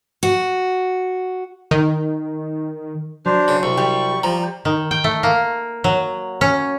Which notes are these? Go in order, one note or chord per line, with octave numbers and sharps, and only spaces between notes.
F#4
D#3
F#3 D4 C5
C#3
C2 C#6
G3
F3 A#5
D#3
G5
A3
A#3
F#3
C#4